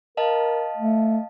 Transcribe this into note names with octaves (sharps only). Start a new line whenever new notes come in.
A#4 D#5 F5 A5
A3